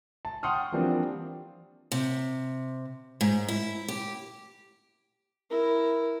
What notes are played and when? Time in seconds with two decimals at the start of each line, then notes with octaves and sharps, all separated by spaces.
0.25 A5
0.43 F#5 G5 C6 C#6 D#6 F6
0.72 E3 F3 G3 A#3 C4 D4
1.92 C3
3.21 G#2
3.48 E4
3.88 G4
5.50 E4 A#4